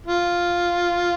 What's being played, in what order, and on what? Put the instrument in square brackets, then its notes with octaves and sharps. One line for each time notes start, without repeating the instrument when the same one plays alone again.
[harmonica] F4